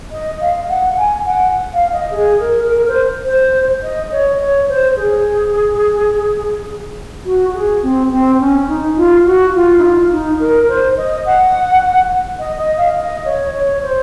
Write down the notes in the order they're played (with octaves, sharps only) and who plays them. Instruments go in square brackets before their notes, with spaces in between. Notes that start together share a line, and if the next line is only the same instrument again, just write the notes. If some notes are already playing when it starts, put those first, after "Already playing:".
[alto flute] D#5
F5
F#5
G#5
F#5
F5
D#5
G#4
A#4
A#4
C5
C5
D#5
C#5
C#5
C5
G#4
F#4
G#4
C4
C4
C#4
D#4
F4
F#4
F4
D#4
F4
D#4
A#4
C5
D#5
F#5
D#5
D#5
F5
D#5
C#5
C#5
C5